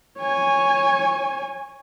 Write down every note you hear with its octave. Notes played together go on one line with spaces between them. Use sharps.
C#5 G#5